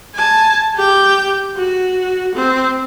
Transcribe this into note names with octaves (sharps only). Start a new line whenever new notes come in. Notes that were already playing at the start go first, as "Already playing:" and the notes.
G#5 A5
G4 G5
F#4
C4